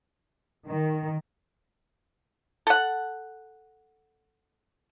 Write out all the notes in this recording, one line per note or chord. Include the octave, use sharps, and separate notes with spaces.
D#3
A4 F#5